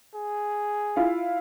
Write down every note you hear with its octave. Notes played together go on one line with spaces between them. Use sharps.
G#4
E4 F4 F5